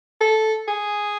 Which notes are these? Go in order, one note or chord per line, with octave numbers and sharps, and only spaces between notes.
A4
G#4